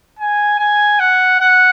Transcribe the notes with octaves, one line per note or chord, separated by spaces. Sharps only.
G#5
G#5
F#5
F#5